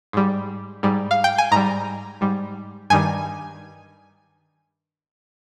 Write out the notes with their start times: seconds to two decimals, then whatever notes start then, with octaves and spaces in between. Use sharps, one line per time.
0.13 G#2 G3
0.83 G#2 G3
1.11 F5
1.24 G5
1.38 G#5
1.52 G#2 G3 A#5
2.21 G#2 G3
2.90 G2 D#3 G3 G#5